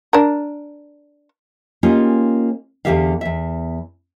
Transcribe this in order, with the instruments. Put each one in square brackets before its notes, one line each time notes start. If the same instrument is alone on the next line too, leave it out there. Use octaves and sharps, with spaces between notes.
[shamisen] D4 A#4
[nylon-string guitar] A#3 C#4 D#4 F4 G4 G#4
E2 D3 E3 G4 E5 F5
E2 E5